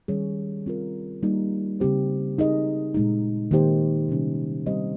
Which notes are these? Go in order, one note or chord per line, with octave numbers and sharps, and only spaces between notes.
D#3 G3 C#4 G#4 C#5
C4 F4 A#4
G3 A#3 D#4
C#3 G3 C4 G4 C5
C4 D#4 G#4 D#5
A#2 G#3 D#4
D#3 A#3 D#4 G4 C5
C3 G3 C#4
G3 C4 G4 C5 D#5